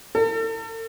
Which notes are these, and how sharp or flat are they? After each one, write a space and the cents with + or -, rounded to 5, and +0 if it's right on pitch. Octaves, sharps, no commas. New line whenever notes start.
A4 +45